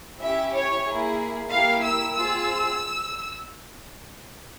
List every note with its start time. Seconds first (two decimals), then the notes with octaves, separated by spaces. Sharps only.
0.20 C#4 E4 G4 E5
0.53 C#5
0.85 A#3 E4 G#4
1.51 A#3 E4 G4 F5
1.84 E6
2.17 C4 F4 G#4 E6